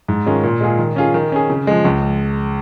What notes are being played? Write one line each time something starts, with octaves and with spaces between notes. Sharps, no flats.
G#2
D#3 G#3 C#4 F4
A#2
G#3 F4 G#4
D#3
C#4 F4 G#4
D#3
C#4 G#4
C#3
F3 G#3
C#2